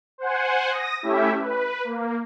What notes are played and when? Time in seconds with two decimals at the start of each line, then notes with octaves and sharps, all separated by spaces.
0.18 C5 F#5 G#5
0.71 D#6 A#6
1.02 A3 C#4 E4 G4 E5
1.39 B4
1.84 A#3